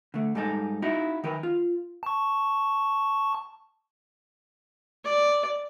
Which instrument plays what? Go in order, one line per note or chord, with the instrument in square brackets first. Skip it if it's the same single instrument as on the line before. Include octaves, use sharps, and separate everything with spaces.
[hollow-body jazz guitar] D3 A3
G#2 G3 D#4 A4
D#4 E4 F#4
D#3 A#4 B4
F4
[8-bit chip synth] A5 C#6
[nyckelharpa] D5